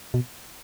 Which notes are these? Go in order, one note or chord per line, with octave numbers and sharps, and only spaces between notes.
B2